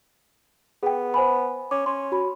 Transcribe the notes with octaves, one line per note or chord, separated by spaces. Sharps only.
B3 G#4 G5
C5 G#5 B5
C#4 D6
C#4 C6
F#4 B5